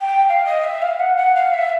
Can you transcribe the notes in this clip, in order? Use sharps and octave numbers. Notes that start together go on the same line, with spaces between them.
G5
F5
D#5
E5
F5
F#5
F#5
F5
E5